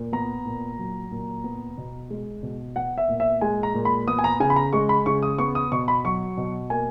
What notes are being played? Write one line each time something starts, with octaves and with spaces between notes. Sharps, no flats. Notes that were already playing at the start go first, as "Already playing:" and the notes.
Already playing: A#2
B3 A#5
A#2
F#3
A#2
B3
B2
G#3
B2
B3 F#5
E5
A#2
E5
G#3 G#5
A#5
A#2
B5
B3 D#6
G#5
A#5
C#3 G#5
B5
A#5
G#3 C#6
B5
C#3 C#6
D#6
B3 C#6
D#6
B2 C#6
B5
F#3 C#6
B2
A#3 G#5